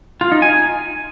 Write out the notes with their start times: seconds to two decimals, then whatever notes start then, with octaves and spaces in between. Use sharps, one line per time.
0.21 F4
0.32 D#4
0.42 G#5